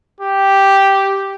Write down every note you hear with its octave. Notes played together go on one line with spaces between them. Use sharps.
G4